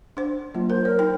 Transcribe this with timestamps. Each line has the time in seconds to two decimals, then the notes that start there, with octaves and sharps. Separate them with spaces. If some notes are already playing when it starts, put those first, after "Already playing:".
0.17 D4 C5
0.55 F#3 A#3 F4
0.70 A#4 C5
0.85 A#4 C#5
0.99 D#4 G5